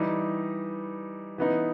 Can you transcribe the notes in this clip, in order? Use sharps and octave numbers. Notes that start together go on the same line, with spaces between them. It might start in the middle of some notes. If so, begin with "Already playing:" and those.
Already playing: E3 G3 D#4
E3 B3 D#4